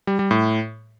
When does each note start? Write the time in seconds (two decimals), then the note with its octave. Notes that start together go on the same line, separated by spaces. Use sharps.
0.07 G3
0.19 G3
0.31 A2